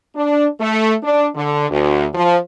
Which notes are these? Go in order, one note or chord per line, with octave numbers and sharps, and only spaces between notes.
D4
A3
D4
D3
D2
F3